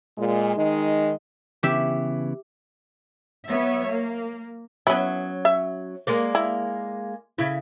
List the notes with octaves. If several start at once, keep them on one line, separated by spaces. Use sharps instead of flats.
A#2 G#3
D#3 G#3 D#4 D#5
C#3 E3 B3 G4 E5
F#3 B3 C#5 E5
A#3
F#3 B3 C#4 E4
E5
G#3 A#3 D5
E4
C#3 E4